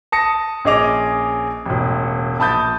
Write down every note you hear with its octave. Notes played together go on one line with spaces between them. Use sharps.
A5 D#6 A#6 C#7
A#1 C#4 G#4 D#5 D6 F7
E1 A1
A#1 A5 B5 D#6 G6 A6